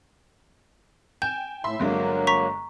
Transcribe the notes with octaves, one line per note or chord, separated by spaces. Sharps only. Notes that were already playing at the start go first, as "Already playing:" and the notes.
G5 G#5 G6 E7
A2 E5 B5 C6
G1 F#3 G#3 A#3 D4
A#5 C#6 B6